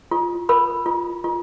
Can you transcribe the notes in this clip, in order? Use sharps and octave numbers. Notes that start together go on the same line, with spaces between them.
F4
A#4 B5
F4
F4